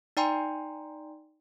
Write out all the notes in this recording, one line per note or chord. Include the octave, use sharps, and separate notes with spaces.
D#4 D5 G5 G#5 A#5 C6